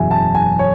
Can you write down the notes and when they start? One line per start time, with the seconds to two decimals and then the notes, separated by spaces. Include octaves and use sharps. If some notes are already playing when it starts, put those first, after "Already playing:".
Already playing: F#1 E2 B2 G#3 E5 G#5
0.11 A5
0.35 G#5
0.59 C#5